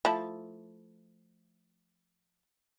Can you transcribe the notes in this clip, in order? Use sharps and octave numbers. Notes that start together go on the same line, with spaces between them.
F3 A3 E4